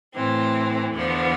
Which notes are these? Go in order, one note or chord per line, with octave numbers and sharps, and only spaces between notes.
A2 E3 C4
E2 D3 F3 B3